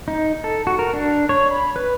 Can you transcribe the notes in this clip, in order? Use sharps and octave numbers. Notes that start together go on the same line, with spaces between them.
D#4
A4
F#4
A#4
D4
C#5
B5
B4